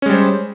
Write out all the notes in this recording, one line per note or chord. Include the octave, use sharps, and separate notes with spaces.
G3 G#3 C#4 C5